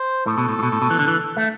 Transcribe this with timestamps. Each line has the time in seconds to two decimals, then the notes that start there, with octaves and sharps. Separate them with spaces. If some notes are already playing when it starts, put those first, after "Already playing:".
Already playing: C5
0.26 A2 A4
0.38 B2
0.49 A2
0.59 A2
0.63 B2
0.72 A2
0.82 B2
0.90 E3
0.99 D3
1.07 E3
1.37 A3